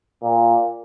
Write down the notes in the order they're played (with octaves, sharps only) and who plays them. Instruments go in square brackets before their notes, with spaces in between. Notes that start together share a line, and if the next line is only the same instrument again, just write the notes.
[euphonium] A#2